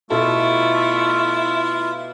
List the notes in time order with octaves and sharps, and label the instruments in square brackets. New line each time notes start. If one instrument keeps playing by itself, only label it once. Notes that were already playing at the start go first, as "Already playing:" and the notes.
[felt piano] B2 B3 A4 [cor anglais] A3 [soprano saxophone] E4 [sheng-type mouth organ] F4